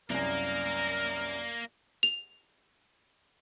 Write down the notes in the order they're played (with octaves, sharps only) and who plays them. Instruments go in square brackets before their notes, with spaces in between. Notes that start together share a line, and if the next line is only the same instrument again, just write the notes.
[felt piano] C2 F#2 [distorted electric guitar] A#3 [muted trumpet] A#4 [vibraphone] D5 A#5
[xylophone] F7